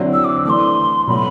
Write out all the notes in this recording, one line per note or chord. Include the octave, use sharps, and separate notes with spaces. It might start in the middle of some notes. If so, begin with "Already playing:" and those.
Already playing: D3 F#3 C4 E4
E6
D6
E3 A3 D4 C6 D6
B2 F#3 A3 B5